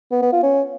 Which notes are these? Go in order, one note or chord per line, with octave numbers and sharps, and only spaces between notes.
B3
B3
F4
C#4